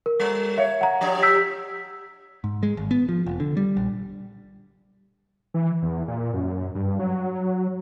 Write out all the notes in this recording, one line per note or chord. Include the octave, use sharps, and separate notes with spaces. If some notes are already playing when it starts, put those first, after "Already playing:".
A#4
G3
C#5 E5 F5
F#5 A#5
F3 D4 G4
E6 G6 B6
G#2
G#3
G#1
B3
F3
F1
D3
G3
A#1
E3
E2
A#2
F#2
G2
F#3